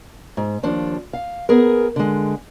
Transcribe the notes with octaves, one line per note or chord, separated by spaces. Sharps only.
G#2
D#2 F3 D4
F5
B3 G#4 A#4
D3 G#3